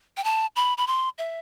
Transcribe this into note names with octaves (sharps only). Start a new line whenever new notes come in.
G5
A5
B5
B5
C6
E5